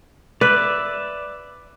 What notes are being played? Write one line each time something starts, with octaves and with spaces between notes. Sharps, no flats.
B4 D5 E5